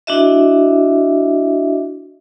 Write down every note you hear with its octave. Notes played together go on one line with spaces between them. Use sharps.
D4 E4 F#4 D#5 E5